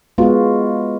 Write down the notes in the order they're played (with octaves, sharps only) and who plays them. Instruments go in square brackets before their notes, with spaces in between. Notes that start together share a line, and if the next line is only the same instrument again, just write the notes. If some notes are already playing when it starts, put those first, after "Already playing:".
[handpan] G#3 B3 F4 F#4